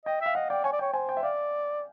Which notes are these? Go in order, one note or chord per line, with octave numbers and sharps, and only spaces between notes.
D#5 G5
E5 F5
D#5 F#5
D5 G5
C#5 G#5
D5
G5
C#5
C5 G#5
G5
E5
D5 F5